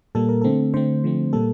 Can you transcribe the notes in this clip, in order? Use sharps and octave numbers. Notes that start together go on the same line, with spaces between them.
A#2 G3 A#3 A4
A#4
D3 A3 C4 A4
D3 A3 C4 C5
D3 F3 A3 C4
A#2 G3 A#3 A4